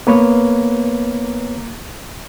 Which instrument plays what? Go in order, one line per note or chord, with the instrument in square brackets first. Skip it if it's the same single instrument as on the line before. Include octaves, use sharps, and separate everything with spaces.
[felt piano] A#3 [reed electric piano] B3 B4 C#5